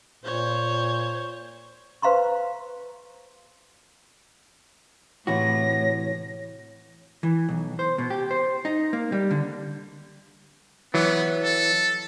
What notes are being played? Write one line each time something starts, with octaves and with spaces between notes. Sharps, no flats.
A#2 C5 C#5
B4 C5 F5 A#5 C6 C#6
A2 C3 E3 F#4 C#5 A#6
E3
B1
C5
B2
G4
C5
D#4
A#3
G3
D3
E3 F#3 B3
A4